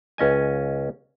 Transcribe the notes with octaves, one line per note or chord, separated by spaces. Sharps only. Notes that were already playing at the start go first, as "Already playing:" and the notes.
C#2 C#4 D#5 G#5